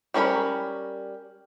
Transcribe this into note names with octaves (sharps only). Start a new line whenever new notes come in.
G3 C#4 A#4 D5 B5